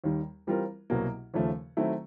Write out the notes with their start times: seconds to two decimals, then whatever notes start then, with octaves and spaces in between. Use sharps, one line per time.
0.04 D#2 D#3 G3
0.47 E3 G3 C4 F4 A#4
0.90 C2 B2 F#3 A#3
1.34 D#2 C#3 F3 A3
1.77 D#3 F#3 A3 C4 E4